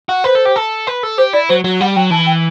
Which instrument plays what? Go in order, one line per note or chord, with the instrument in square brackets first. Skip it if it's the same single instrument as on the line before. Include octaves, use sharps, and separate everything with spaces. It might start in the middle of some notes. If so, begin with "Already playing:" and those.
[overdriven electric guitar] F#4
[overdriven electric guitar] B4 [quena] C5
[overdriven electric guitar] A4
G4
A4
B4
A4
[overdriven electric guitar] G4 [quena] C5
[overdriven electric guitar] E4 [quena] D5
[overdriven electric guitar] F#3 [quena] C5
[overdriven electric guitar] F#3
[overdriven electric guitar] G3 [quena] F#5
[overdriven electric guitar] F#3 [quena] G5
[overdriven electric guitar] E3 [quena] A5
[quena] G5